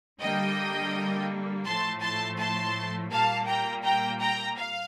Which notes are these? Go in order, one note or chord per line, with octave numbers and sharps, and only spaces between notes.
D3 G3 A#3 D#5 G5
A2 F3 A3 A5 C6
A5 C6
A5 C6
A#2 G3 A#3 F5 A5
G5 A#5
G5 A#5
G5 A#5
F5